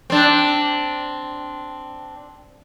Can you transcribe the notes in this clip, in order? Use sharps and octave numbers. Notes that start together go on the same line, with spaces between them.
C4 D4